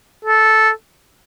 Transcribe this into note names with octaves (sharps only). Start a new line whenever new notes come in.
A4